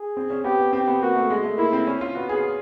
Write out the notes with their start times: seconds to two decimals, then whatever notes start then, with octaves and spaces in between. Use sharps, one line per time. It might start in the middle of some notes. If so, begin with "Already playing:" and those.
Already playing: G#4
0.17 C4
0.30 C#4
0.44 B3 G4
0.59 B3
0.73 C4 G4
0.88 B3
1.02 A#3 F#4
1.15 A3
1.30 G#3
1.43 A3
1.58 A#3 E4
1.73 C4
1.87 C#4
2.01 F4
2.14 B3 F#4
2.29 G#4